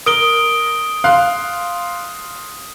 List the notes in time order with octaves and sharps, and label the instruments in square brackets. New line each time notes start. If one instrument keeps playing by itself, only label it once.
[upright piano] A#4 [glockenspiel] D#6 D7 G7
[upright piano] F5 C6 F#6